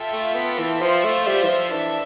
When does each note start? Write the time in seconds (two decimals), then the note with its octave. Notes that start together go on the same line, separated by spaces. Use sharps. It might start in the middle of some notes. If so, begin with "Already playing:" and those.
Already playing: F4 A4 E5 G5
0.13 A3
0.35 B3
0.59 E3
0.82 F3 F4 C5 E5
1.04 A3
1.27 G3
1.43 E3
1.49 F3
1.73 E3 D4 A4 E5